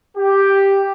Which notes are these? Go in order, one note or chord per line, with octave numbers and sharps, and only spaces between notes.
G4